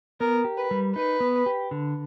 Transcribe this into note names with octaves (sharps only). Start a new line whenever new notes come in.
B3 A#4
G4
B4
G3
D#4 B4
B3
G4
D3